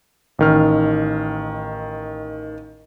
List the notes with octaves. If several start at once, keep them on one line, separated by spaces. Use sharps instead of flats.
A1 D#3 F6